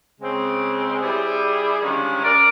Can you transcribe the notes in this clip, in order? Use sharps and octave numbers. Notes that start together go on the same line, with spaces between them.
C#3 G#3 C4
G3 E4 G4 G#4
D3 D#3 F3 G3 G#3 C#4
A#4 D5